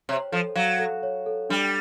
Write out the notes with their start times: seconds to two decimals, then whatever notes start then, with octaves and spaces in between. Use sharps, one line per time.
0.09 C3 C#5
0.32 F3 A4
0.56 F#3 F5
0.79 A4
1.03 C#5
1.26 A4
1.49 G3 D4